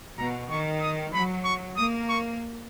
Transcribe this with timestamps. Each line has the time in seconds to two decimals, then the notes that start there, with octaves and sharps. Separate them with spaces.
0.18 B2 A#5
0.50 D#3 C#6
0.81 D#6
1.13 F#3 B5
1.45 C#6
1.77 A#3 D#6
2.09 C#6